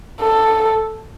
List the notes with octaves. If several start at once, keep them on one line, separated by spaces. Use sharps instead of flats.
A4